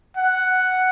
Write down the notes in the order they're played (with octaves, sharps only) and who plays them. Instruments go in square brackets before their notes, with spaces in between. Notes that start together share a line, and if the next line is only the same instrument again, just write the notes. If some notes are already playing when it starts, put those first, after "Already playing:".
[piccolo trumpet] F#5